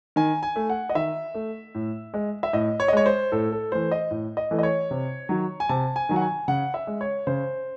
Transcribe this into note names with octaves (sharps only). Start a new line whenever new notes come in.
D#3 G#5
G#5
A3
F#5
D#5
D#3 E5
A3
A2
G#3
E5
A2 D#5
C#5
D#5
G#3 C#5
C5
A2 A4
A4
E3 A3 C5
D#5
A2
D#5
E3 A3
D#5
C#5
C3
D#3 F#3
G#5
C3 A5
G#5
D#3 F#3
F#5
G#5
C#3 F#5
E5
G#3
C#5
C#3 C5